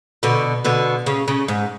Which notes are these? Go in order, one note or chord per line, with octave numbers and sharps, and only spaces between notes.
B2 D3
B2 D3
C#3
C#3
G#2